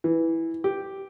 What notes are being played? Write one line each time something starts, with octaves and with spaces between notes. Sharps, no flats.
E3
G4